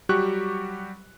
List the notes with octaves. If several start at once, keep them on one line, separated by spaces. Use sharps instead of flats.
F#3 G3 F#4 G4 C#6 F#6